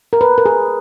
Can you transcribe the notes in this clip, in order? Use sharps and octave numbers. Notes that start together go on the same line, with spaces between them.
A#4
B4
A#4
G#4